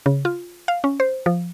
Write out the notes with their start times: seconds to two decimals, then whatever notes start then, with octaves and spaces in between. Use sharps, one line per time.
0.06 C#3
0.25 F4
0.68 F5
0.84 C#4
1.00 C5
1.26 F3